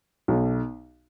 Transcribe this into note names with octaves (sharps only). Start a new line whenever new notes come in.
B1